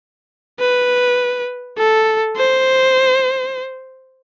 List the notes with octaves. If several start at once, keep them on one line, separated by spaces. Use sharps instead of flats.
B4
A4
C5